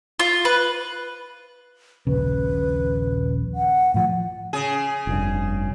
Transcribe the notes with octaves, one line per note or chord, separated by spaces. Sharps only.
F4
B4
D#1 A#1 C#3 B4
F#5
A2 F3 F#5
C#3 G#4
F1 G2